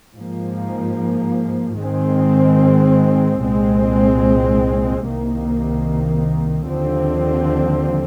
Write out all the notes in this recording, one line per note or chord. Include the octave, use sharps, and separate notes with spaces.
G#2 F3 A#3
G#2 D#3 G#3 C4
C2 A#2 G#3 C4
C2 C3 D#3 A#3
D#2 D3 F3 C4